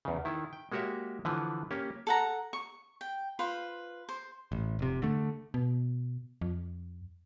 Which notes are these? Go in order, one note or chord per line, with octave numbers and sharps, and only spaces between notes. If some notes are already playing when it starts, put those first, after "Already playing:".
E2 C#3
D#3 E4
G5
G#3 A#3 F#4 G4 C#5 E5
D3 E3 F3 B4
A#3 C#4 G4
A4 F#5 A#5
C#6
G5
F4 B4 C5
C5
A1
F1 C3
D3 A3
B2
F2